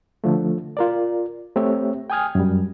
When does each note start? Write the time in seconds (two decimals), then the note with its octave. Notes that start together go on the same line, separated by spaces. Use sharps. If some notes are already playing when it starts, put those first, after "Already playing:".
0.24 D3 F3 A3
0.77 F4 A#4 D5
1.56 A3 C4 G4 C#5 E5
2.10 G5 G#5 D#6 F6 G#6
2.35 F#2 G3